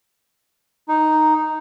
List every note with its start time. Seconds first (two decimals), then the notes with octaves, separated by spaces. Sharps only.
0.88 D#4